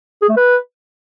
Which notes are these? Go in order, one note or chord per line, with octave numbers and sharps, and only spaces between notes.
G#4
A3
B4